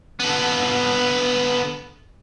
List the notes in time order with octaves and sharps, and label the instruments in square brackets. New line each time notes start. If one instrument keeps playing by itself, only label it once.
[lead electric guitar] D3 B3